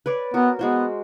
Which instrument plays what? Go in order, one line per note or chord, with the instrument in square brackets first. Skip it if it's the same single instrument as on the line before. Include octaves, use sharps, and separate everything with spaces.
[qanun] B4 C#5 D5
[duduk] B3 [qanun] F#4 A#4
[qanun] G#3 F#4 C5 [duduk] B3